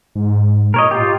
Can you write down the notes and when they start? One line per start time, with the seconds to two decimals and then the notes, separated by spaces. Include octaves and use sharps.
0.15 G#2
0.74 A#2 A#4 C#5 D#5
0.91 F4 G4